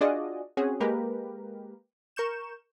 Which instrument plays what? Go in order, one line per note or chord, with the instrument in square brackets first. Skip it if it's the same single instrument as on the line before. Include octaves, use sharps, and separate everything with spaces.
[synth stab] D4 F4 F#4 G#4 D5 D#5
C4 C#4 F#4 G#4
G#3 A#3 G4 A#4 B4
A#4 C#6 G6 E7